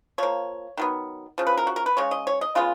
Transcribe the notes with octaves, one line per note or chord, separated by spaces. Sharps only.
F3 A#3 C#5
D#3 F#3 B3
C#3 F3
B4
A#4
F#4
A#4
B4
C#3 G#3 C#5
D#5
C#5
D#5
C#3 G#3 B3 F4